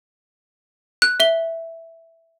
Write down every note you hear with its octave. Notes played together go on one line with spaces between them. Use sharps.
F#6
E5 G7